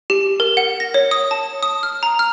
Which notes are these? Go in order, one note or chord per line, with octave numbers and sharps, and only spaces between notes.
G4
A#4
F#5
A#6
C#5
D#6
A5
D#6
F6
A#5
F6